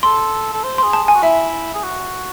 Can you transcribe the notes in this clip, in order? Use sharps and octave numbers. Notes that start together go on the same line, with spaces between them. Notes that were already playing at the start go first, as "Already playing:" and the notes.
A4 C6
A4
C5
G#4 C6
A5
G#4 G#5
F#4
E4 E5
G#4
F#4